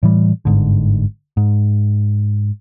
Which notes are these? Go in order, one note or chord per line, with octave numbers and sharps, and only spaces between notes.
A2 E3 G3
G1 G#2 D3
G#2